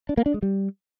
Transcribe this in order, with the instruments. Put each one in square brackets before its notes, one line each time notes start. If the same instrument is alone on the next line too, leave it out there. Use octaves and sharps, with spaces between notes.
[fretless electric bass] D4
A#3
D4
G#3
G3